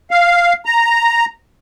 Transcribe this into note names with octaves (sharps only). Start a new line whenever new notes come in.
F5
A#5